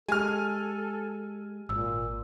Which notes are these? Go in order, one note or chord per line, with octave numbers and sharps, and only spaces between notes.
G#3 G4 A4 G#5 F6
G#1 A#2 E6